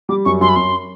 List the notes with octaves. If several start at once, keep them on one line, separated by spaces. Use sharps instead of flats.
G3 D6
F#2 C#6
F#2 C6
B5
F#2 C6